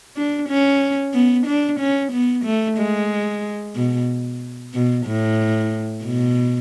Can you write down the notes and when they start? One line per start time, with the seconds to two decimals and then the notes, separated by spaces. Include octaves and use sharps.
0.16 D4
0.49 C#4
1.13 B3
1.46 D4
1.79 C#4
2.12 B3
2.45 A3
2.78 G#3
3.75 B2
4.74 B2
5.06 A2
6.04 B2